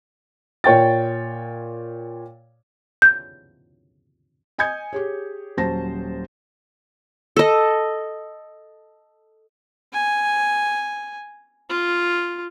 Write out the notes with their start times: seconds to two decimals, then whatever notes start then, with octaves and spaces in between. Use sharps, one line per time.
0.64 A#2 C#5 G5 A6
3.02 G6
4.58 D#5 G#5 D#6 G6 G#6 C#7
4.93 G4 G#4 C#5
5.57 D#1 F#3 C#4 C5 A5 A#6
7.36 A4 D#5
9.93 G#5
11.69 F4